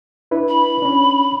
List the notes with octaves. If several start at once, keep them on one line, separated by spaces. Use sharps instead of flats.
D4 E4 B4
B5
C#4 D4